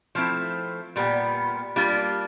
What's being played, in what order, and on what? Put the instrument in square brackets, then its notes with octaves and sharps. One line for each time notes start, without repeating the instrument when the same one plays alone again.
[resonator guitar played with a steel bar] F3 A3 C4 E4
A#2 G3 B3
G3 A#3 D4 F4